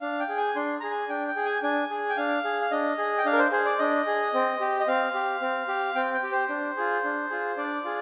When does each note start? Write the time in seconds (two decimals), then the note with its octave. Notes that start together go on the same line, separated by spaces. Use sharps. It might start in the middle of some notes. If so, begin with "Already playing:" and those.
0.01 D4 F5
0.20 G5
0.29 G#4
0.37 G#5
0.55 D4 C6
0.80 G#4 A#5
0.91 G#5
1.09 D4 G5
1.28 G5
1.36 G#4
1.45 G#5
1.63 D4 G#5
1.90 G#4
2.10 G5
2.17 D4 F5
2.44 G#4
2.61 F5
2.71 D4 D#5
2.98 G#4
3.18 G5
3.25 D4 F5
3.33 A#4
3.39 C5
3.52 G#4 C5
3.65 D5
3.79 D4 D#5
4.07 G#4
4.34 C4
4.61 G4
4.80 D#5
4.88 C4 F5
5.14 G4
5.41 C4
5.68 G4
5.95 C4 G5
6.14 G5
6.23 G4
6.32 C5
6.49 D4
6.77 F4 G#4
7.04 D4
7.30 F4 G#4
7.57 D4 D5
7.84 F4 G#4